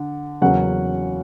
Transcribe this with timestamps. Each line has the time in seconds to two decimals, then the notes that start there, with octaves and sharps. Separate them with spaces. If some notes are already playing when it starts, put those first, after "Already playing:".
Already playing: D3
0.41 E2 C#3 F#3 A#3 C#4 F#5